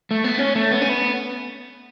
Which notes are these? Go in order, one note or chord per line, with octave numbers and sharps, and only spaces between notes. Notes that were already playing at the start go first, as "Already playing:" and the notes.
A3
B3
C#4
A3
B3
C#4
B3